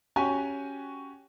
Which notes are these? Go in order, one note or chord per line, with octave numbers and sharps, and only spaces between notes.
C#4 F#4 G4 G#5 C#6